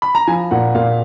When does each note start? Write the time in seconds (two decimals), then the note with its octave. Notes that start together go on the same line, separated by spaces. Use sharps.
0.02 B5
0.15 A#5
0.27 F3 G#5
0.51 A#2 F#5
0.75 A#2 F5